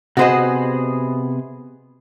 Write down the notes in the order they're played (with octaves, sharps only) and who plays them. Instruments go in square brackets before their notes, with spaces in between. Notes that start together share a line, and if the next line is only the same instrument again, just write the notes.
[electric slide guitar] C3 B3 G#4 [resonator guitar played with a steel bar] F#4 C5 D#5